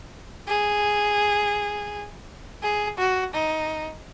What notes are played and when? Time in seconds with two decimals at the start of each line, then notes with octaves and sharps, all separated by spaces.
0.48 G#4
2.63 G#4
2.98 F#4
3.34 D#4